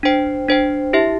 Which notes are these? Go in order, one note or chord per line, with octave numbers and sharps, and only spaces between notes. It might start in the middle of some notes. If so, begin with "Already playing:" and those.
D4 C5 G5
D4 C5 G5
E4 G4 E5